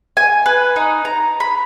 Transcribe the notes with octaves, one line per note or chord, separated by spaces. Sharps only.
G#5
B4
D#4
A#5
B5